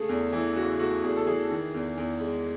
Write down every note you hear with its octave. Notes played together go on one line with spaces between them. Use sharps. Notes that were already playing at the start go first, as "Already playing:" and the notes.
Already playing: C#3 A3 G#4
E2
E3
C#3 F#4
A3 F#4
E2 G#4
A4
E3 G#4
D#3
E2
E2
G#3